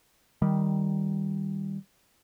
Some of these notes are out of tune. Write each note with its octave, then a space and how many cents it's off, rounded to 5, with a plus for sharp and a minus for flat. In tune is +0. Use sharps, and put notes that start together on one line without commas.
D#3 +0 G3 +0